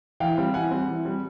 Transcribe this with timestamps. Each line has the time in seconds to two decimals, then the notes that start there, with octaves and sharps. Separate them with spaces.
0.20 E3 F5 G5
0.37 G3 C4
0.54 E3 F#5 G#5
0.71 G3 C4
0.88 E3
1.05 G3 C4